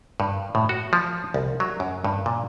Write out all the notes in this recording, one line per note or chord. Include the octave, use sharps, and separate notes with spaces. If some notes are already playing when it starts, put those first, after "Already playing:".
G2
A2
F#4
F3
C2
F#3
F#2
G2
A#2